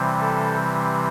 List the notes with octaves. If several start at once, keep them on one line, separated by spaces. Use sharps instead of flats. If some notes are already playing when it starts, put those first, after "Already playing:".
Already playing: C3 E3 G3 C4
A4